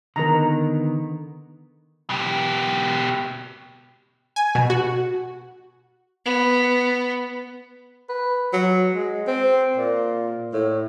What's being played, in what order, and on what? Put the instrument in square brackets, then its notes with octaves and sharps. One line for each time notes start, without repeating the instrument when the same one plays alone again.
[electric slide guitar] D3 D#3 B3 [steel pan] A#4 A#5
[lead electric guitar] B2 G4
[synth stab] G#5
B2
F#4
[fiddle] B3
[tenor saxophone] B4
F#3
G#3
C4
A#2
A2